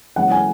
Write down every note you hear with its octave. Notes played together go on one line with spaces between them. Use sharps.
F#1 F#2 E3 G#3 C#4 F#5
G#5